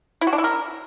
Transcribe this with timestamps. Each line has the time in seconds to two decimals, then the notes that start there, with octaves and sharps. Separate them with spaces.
0.21 E4
0.27 F#4
0.33 D4
0.38 E4
0.44 A#4